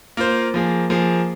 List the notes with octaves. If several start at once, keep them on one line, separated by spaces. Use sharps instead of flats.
A#3 F4 C5
F3 A#3 G#4
F3 A#3 G#4